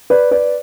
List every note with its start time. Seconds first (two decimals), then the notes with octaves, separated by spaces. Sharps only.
0.10 B4 D5
0.31 B4 D5